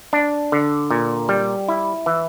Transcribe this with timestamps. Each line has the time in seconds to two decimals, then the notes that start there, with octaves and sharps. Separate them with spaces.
0.13 D4
0.52 D3
0.91 A#2
1.29 G3
1.68 E4
2.06 E3